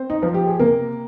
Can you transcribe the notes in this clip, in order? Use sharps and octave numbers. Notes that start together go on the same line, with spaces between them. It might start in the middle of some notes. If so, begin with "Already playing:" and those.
Already playing: C4 C5
D#4
F3 F4
G4
G#4
C3 A#3 A#4